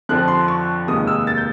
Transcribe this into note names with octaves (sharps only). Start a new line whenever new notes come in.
F2 D3 F3 F#6
C6
C#6
F1 D#2 D#3 G#3 D#6
E6
A6
G6